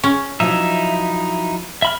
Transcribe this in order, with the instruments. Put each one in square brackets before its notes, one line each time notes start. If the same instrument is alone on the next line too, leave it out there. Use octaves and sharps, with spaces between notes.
[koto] C#4
[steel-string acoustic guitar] F3 F#3 E4 [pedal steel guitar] D#4 E5
[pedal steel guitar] E5 B5 F6